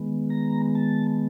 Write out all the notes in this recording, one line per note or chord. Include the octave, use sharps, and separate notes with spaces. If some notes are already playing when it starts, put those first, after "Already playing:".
Already playing: D#3 G#3 B3
A#5
A5